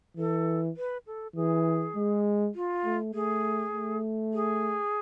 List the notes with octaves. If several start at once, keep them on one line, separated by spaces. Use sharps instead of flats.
E3 A4
B4
A4
E3 G#4
G#3
F4
A3
A3 G#4
A3
G#4